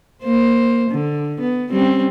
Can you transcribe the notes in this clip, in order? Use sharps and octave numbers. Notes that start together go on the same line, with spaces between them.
A#3 C5
D3
B3
G3 C4 C#4